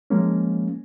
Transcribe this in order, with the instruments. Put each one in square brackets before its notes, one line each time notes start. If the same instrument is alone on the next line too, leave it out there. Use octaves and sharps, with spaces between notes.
[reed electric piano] F3 G#3 A#3 C#4